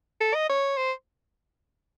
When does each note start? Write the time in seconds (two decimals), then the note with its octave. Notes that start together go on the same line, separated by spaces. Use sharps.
0.21 A4
0.34 D#5
0.49 C#5
0.77 C5